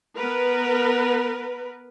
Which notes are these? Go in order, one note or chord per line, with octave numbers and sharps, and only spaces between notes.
B3 A#4 B4